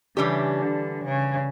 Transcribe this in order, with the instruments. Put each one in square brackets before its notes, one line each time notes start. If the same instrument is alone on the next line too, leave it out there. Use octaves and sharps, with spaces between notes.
[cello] C#3 [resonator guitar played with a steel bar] E3 G3 D4 G4
[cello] D3
C#3